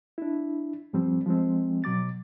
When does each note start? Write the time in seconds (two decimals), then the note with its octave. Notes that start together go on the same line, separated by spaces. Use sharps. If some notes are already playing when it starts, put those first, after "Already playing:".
0.18 D4 E4
0.93 G2 F3 G3 C4
1.26 F3 G#3 C4
1.84 B2 F#3 D6 A6